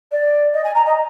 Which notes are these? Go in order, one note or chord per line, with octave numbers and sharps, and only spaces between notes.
D5
D#5
G#5
A#5
D#5